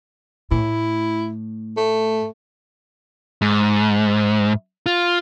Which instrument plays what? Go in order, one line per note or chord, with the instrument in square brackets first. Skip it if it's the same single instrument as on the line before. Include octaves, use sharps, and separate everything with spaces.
[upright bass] A2 [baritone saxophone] E4
[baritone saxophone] A3
[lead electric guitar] G#2
F4